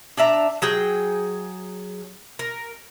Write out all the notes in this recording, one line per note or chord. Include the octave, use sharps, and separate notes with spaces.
D4 D5 E5 A#5
F#3 G#4 G5
A#4